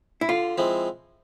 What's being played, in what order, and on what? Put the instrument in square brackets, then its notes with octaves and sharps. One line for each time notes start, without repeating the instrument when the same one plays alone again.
[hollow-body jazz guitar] E4
[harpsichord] D3 [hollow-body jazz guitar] F4
[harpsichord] F3 G#3 C4 E4